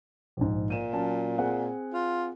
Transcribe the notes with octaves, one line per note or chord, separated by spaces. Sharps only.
A#1 G#2
A#2 D#7 E7
F#3 C#4 A5
C4 G#4 F#5
F4